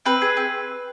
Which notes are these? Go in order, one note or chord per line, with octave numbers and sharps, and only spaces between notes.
C4 B4
G#4
C4